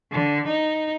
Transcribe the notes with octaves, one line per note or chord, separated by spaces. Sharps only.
D3
D#4